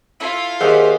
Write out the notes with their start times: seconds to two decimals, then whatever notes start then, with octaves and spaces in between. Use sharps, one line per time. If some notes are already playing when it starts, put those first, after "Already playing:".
0.20 E4 F4 A4 F5
0.61 D#2 G#4 C5 E5 F#5